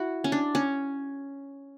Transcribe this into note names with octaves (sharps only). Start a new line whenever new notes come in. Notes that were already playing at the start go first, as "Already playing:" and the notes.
Already playing: E4 F#4
C#4
D4
C#4